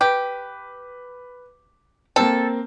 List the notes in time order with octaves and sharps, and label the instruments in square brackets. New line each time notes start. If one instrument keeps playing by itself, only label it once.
[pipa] G4 [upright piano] B4
[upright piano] A#3 C4 [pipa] A4